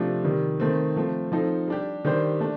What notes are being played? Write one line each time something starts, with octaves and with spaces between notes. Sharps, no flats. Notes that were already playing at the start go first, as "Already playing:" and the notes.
Already playing: C3 F3 A3 D4
C3 D#3 G3
D#3 A3 C4
F3 A3 C4
F3 C4 D#4 A4
G3 D4 G4
D#3 G3 D4 G4 C5
A3 D4